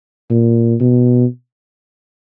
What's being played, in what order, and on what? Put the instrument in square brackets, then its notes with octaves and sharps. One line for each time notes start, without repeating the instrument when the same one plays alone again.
[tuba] A#2
B2